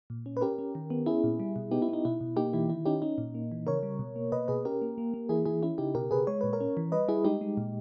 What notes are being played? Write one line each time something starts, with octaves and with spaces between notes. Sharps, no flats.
A#2
C#4
B4
C#4 G4 A#4
C#4
D#3
B3
C#4 E4 G#4
A#2
G3
B2
B3 D#4 G4
E4
B3 D#4
B2 E4
B2
A#3 D#4 G4
E3 E4
D#3 E4
C#4 D#4 G4
C#4 D#4
A#2
A#3
E3
C#3 A#4 C#5
G3
B2
A#3
B2 B4 D#5
B2 G#4 B4
C#4 G4 A#4
A#3
A#3
A#3
E3 E4 G#4
E3 E4 G#4
C#4 E4
C#3 D#4 G4
B2 G4 A#4
B2 G#4 B4
G#3 C#5
A#2 B4
A#4 C#5
C#4
E3
G3 B4 D#5
G3 E4 G#4
G#3 D#4 G4
G#3
A#2